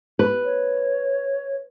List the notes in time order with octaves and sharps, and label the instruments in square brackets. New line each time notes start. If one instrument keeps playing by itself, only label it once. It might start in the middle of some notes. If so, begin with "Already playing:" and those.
[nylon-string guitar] B4
[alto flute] C#5